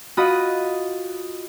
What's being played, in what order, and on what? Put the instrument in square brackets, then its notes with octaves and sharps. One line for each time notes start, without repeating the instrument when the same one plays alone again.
[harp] F4 F#4 D#5 B5 D#6